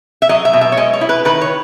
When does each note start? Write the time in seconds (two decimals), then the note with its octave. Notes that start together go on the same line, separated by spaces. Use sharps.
0.22 E5
0.29 F#3 D#5
0.45 E5
0.53 B2
0.61 E5
0.72 C#5
0.77 G#3 D#5
0.93 C#5
1.01 E4
1.09 B4
1.25 D#3 B4
1.41 C#5